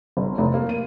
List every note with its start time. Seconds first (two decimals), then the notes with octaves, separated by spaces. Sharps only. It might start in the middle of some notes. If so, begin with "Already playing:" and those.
0.17 G1
0.38 F1
0.54 A#3
0.69 D#7